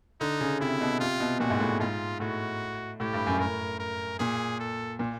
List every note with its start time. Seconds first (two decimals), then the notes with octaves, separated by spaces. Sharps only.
0.21 D3 D#4
0.41 C#3
0.61 C3 E4
0.81 B2
1.00 C3 F4
1.20 B2
1.40 A#2 F#4
1.50 G#2
1.60 A2
1.80 G#2 F4
2.20 A2 F#4
3.00 A2 G4
3.13 G2
3.27 F#2
3.39 A2 A#4
3.80 A#4
4.19 A#2 G#4
4.60 A4
4.99 A#2